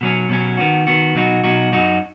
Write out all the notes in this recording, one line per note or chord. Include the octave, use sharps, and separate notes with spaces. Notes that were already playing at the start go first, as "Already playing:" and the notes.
B2 F#3 C#4
B2 F#3 C#4
D#3 B3 F#4
D#3 B3 F#4
B2 F#3 D#4 F#4
B2 F#3 D#4 F#4
F#2 F#3 D#4 F#4